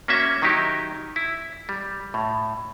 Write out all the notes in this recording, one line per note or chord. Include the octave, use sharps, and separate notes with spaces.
A#3 C#4 F#4 E5
D#3 F#3 D#4 E4 G4
E4
G3
A2